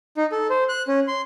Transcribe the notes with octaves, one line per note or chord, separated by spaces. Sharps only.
D#4
A4
C5
F#6
C#4
C6